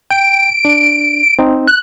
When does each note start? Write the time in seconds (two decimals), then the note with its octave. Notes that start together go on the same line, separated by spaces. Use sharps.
0.11 G5 D7
0.65 D4
1.39 C4 D#4
1.67 F#6